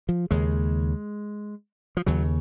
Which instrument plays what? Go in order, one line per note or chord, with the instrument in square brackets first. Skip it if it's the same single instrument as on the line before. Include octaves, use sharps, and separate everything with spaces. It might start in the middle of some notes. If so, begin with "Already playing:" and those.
[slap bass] F3
D#2 C#3 G#3
F3
D#2 C#3 F#3